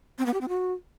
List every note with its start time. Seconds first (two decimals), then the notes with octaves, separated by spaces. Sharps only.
0.19 C4
0.26 B3
0.34 G4
0.41 C4
0.49 F#4